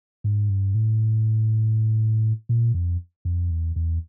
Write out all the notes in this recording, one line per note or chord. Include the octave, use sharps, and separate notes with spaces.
G#2
G2
A2
A#2
F2
F2
E2
E2